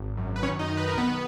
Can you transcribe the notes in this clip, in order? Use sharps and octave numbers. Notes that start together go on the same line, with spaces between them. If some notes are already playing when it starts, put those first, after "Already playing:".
Already playing: G#1
F#2
B4
D#3 C#4 C#5
D#4 D#5
D#3
B4
A#4
B1 B3 B4